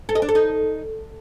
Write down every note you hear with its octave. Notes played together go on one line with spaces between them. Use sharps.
A4
D#5
D4
A4
D#4